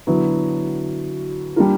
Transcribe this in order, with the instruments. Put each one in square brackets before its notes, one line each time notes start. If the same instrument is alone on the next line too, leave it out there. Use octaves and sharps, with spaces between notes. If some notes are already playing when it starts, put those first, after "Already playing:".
[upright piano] D3 F#3 B3 E4
G3 A#3 D4 F4 A#4